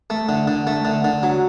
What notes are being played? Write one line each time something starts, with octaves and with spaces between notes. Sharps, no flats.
A3
D3
D3
A3
D3
D3
F#3